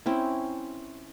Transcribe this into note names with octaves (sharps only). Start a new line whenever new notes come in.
C4 C#4 E4